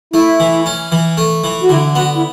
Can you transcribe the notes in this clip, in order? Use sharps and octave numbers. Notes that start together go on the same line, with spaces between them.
A3 E4
E3
C#4
E3
A3
E3
F#4
D3 E4
B3 F#4
E4